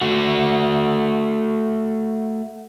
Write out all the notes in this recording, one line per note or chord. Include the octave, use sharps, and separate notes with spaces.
A3 F#4